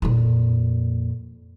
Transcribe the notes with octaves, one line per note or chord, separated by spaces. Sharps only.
F2 A#2